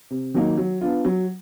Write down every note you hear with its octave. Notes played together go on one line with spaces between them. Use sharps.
C3
D#3 F#3 A#3 D#4
F#3
B3 D4 F4
F#3